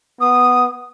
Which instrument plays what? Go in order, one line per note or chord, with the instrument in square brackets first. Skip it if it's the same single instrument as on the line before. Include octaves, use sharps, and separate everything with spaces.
[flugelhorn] B3 [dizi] D#6